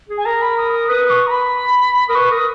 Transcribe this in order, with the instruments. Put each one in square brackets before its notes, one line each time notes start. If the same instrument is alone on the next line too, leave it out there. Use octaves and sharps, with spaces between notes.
[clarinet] G#4
[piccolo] G#5
[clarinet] A#4 [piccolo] A#5
[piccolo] B5
D#6
D#6
[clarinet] B4 [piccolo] D#6
[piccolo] D#6
C#6
A#5
B5
[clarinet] A#4 [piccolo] D#6
[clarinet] B4 [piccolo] C#6
[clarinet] A#4 [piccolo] D#6